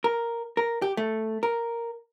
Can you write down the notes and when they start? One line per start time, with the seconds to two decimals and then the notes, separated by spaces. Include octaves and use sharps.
0.04 A#4
0.57 A#4
0.82 G4
0.97 A3
1.43 A#4